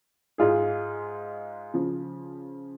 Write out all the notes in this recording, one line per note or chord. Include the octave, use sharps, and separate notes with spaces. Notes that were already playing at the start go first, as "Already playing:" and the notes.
G#2 G#3 F4 G#4
C#3 F3